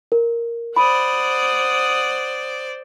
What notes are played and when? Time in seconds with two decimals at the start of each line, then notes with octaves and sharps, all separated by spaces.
0.12 A#4
0.76 C5 D5 F#5 B5 D#6